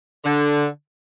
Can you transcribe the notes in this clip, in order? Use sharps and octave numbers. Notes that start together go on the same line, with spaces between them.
D3